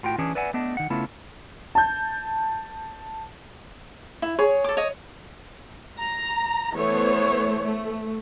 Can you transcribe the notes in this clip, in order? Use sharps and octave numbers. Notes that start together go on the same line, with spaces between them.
A2 F4 F#4 G5
E3 C#4 D4 G#4
B4 D5 E5 F#5 G#5
A3 B3 D4 D#5
D#3 F#5
C#3 A3 B3 E4 F4
A5 G6
E4
G#4 C#5
A4 D6
C#5 D#5
A#5
E3 A3 B3 C5 C#5
A3